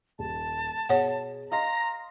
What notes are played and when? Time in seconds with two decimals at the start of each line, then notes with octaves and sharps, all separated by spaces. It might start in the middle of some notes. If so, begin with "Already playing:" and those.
0.19 D#1 A5
0.89 B2 G#4 C#5 F#5
1.52 D#5 F5 A#5 C6 A#6